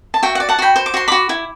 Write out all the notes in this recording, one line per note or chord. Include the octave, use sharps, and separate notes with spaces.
A5
F#4 E5 G5
F#5
D5
F#5 A5
F#4 G5 B5
C5
D6
F#4 C6
F#4 B5 D6
E4